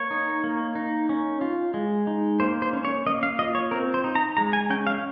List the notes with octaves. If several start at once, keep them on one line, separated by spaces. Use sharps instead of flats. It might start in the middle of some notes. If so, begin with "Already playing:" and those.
Already playing: A#3 C#5
D#4
A#3
D#4
C#4
F4
G#3
D#4
A#3 C5
C5
C#4
C#5
A#3 D#5
F5
F4 D#5
C#5
C4 A#4
C5
D#4
A#5
G#3 A#5
G#5
C#4 G5
F5